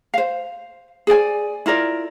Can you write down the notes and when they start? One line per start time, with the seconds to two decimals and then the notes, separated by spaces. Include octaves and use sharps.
0.14 C5 F5
1.07 G#4 C5 D5 G#5
1.66 E4 F4 A#4 D5